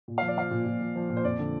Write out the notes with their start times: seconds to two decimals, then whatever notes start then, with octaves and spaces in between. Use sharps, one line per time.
0.08 A#2
0.18 F3 F5
0.28 D5
0.37 F3 F5
0.51 A#2
0.66 A#2
0.81 F3
0.96 F3
1.10 A#2
1.17 C5
1.24 F2 D5
1.39 D3